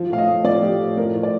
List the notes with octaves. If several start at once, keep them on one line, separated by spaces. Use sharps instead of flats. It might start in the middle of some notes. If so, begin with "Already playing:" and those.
Already playing: F3
A2 F5
D#5
A2
F3 D5
F3 G4
A2
F3 A#4
A2
D5